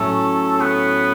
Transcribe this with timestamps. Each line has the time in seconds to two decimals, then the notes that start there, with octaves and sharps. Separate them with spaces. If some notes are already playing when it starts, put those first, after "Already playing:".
Already playing: A2 F#3 A3 C#4 A4
0.61 B3